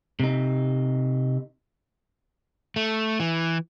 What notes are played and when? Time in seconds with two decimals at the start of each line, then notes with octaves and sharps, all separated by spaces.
0.20 C3 D#4
2.76 A3
3.20 E3